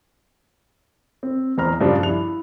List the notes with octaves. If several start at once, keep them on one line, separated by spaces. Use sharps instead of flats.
C4
E2 C5 A#5 F6
G2 C#3 F3 G3 D4
E4 F7